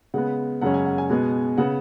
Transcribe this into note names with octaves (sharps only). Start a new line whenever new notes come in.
C#3 G#3 B3 F#5
F#2 C#3 G#3 C#4 F#5
G#5
F#5
G#5
B2 G#3 B3
C#3 B3 F#5